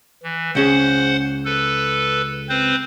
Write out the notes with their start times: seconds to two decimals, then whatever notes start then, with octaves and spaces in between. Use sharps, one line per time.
0.23 E3
0.55 C#2 C#4 G#4 C5 F#5
1.45 A4 B4
2.49 C4 B4 C5